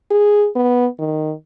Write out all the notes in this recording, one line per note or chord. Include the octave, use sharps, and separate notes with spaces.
G#4
B3
D#3